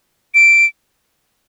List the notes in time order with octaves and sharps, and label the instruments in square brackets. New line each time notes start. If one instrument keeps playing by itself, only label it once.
[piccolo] D7